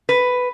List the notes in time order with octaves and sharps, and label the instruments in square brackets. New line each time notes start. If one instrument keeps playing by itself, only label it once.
[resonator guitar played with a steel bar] B4